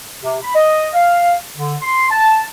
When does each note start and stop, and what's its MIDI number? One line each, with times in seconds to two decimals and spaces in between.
0.23 0.36 48
0.43 0.55 83
0.55 0.87 75
0.94 1.34 77
1.57 1.74 50
1.82 2.07 84
2.10 2.42 81